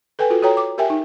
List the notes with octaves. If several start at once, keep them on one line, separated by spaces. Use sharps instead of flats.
A4 B4 G5 G#5
F4 F#4 A4
F#4 A4 C#5 G5 A#5
D6
G4 A#4 E5 G5 G#5
D#4